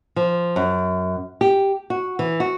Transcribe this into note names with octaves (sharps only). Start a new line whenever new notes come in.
F3
F#2
G4
F#4
E3
F#4